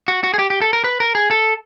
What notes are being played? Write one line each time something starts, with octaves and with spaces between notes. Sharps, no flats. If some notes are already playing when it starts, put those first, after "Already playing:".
F#4
F#4
G#4
G4
G4
A4
A#4
B4
A#4
G#4
A4